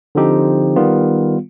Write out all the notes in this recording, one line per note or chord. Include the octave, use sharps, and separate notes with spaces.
D3 F3 C4 D#4 G4
D#3 G3 B3 F4